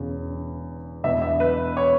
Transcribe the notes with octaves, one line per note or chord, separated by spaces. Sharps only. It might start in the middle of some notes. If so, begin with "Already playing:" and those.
Already playing: E1 E2 C#3
E1 E2 B2 E5
E5
B4
C#5